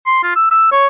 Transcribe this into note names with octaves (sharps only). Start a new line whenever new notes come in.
C6
F4
E6
E6
C#5